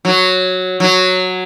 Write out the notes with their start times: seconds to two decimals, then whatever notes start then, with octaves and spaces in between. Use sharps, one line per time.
0.05 F#3
0.80 F#3